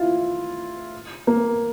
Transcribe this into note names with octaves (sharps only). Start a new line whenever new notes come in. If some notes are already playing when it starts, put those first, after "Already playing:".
Already playing: E4 F4
A#3